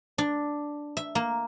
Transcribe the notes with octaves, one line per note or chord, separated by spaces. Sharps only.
D4
E5
A#3